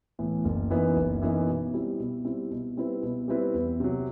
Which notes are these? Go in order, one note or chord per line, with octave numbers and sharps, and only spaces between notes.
A2 E3 B3
F#1
F#2 E3 B3 D#4
F#1
F#2 E3 B3 D#4
B2
G3 C4 E4
B2
G3 C4 E4
B2
G3 C4 E4 B4
B2
G3 C4 E4 B4
E2
C3 F#3